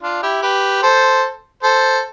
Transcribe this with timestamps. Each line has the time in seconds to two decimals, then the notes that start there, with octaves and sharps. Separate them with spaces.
0.02 D4 F4
0.23 E4 G4
0.42 G4 B4
0.83 A4 C5
1.63 A4 C5